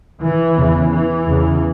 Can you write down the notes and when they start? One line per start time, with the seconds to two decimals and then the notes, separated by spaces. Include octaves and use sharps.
0.21 E3
0.56 E2 C#3
0.90 E3
1.26 E2 C#3